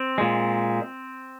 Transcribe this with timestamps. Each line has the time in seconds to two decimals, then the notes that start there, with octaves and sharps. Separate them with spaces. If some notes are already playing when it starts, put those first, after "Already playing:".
Already playing: C4
0.18 A#2 G#3